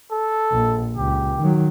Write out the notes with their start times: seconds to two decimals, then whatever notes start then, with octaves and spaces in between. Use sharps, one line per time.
0.12 A4
0.52 A#1
0.97 C#2 G4
1.40 D#3 F#3